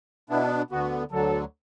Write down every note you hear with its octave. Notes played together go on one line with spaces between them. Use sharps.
B2 B3 D4 E4
D2 D3 B3 F#4
D2 D3 F#3 A4